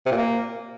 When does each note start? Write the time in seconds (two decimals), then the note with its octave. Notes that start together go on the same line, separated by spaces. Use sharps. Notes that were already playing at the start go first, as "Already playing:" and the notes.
0.06 C3
0.11 A#2
0.17 A#3